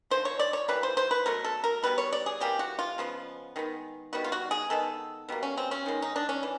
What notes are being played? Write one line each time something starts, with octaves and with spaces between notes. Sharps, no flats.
D3 F3 G#3 C5
C#5
D5
C#5
E3 G3 A#3 B4
C5
C5
B4
B2 F#3 A3 A#4
A4
A#4
B2 G3 B3 B4
C#5
D5
G#4
C3 E3 G3 A#3 G4
F#4
F4
C#3 F3 G#3 B3
D#3 G#3 B3
D#3 G3 B3 F#4
F4
F#4
G#4
D#3 G#3 B3 A4
B2 G3 A#3
C#4
C4
C#4
D#3 G#3 B3
D#4
D4
C#4
E3